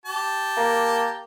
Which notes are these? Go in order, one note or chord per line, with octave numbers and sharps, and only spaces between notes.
G4 A5
A#3